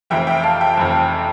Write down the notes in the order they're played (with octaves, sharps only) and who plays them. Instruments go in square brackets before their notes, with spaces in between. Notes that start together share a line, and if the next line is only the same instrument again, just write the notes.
[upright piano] F1 F2 E3 E5 G5
E5 G5
F5 A5
E5 G5
F1 F2 E3